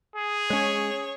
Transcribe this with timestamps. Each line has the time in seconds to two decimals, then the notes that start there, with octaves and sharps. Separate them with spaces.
0.16 G#4
0.50 G#3 C#4 C#5